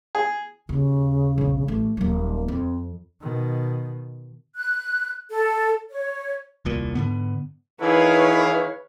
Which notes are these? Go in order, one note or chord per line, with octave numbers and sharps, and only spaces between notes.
G#4
D#2 C#3
E1 A#1
A1 A3
D#1 F#3 A#3
F2 C4
B2 D#3
F#6
A4
C#5
D#1 C2 A#2
G#2 D3 B3
D#3 E3 E4 G#4 B4 C#5 F5